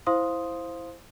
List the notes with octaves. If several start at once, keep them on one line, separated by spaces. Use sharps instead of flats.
E4 C5 F5 C6 D#6